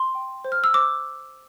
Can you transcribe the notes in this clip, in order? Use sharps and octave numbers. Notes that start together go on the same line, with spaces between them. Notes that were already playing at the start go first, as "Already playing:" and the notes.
Already playing: C6
G5
C5
F6
E6
C5 D6